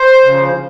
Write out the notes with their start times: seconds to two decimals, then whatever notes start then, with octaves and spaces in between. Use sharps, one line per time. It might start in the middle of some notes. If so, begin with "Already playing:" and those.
Already playing: C5
0.24 C#3 F3